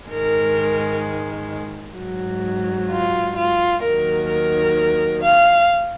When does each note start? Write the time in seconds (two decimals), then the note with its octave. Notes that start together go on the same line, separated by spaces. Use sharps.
0.10 G#2 D#3 G#3 A#4
1.96 G#2 F#3
2.90 F4
3.36 F4
3.83 D#2 D#3 F#3 A#4
4.30 A#4
5.23 F5